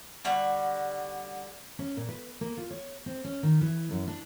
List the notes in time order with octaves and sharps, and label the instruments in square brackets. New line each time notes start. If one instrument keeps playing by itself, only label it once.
[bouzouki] D3 G3 F#4 F#5
[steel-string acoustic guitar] C#4
A#2
B4
A#3
F4
C#5
C4
C#4
D#3
E3
F#2
D4